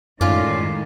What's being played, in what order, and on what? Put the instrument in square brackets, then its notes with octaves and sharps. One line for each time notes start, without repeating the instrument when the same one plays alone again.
[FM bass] F#2 [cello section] A2 D#3 G#3 [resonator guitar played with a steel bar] C#4 F4 [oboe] D5